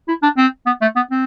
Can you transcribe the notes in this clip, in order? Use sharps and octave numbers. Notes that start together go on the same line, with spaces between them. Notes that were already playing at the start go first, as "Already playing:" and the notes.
E4
D4
C4
B3
A3
B3
C4